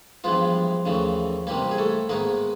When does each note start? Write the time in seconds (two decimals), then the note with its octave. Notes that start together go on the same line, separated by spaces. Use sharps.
0.24 G2 E3 F3 G#3 B3 F4
0.86 D#2 C#3 E3 A3
1.47 C2 C3 E3 G3 A#3 G4
1.71 G#4
1.78 A3 A4
2.09 G#2 D#3 G#3 A#3 B3 A#4